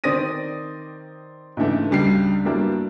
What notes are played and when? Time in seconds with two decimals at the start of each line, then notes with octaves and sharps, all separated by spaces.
0.04 D#3 C4 D5 D#6 A#6 D#7
1.57 G#2 C#3 E3 A3 D4
1.91 C#2 G3 D4 C7
2.45 G2 F#3 G3 A#3 D4 E4